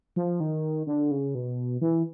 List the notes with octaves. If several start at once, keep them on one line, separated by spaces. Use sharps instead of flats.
F3
D#3
D3
C#3
B2
E3